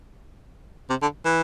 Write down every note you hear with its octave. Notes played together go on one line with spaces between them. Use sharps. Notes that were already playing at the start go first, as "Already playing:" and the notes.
C3
D3
E3